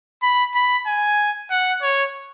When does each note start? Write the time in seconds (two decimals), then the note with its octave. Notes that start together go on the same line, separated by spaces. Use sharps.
0.22 B5
0.55 B5
0.87 G#5
1.51 F#5
1.82 C#5